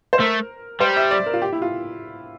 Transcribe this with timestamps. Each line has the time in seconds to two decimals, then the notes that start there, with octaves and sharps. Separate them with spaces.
0.13 C5
0.20 A3 A#4
0.80 G3 C5
0.97 E5
1.11 D5
1.26 A#4
1.34 F4
1.42 G4
1.52 E4
1.62 F4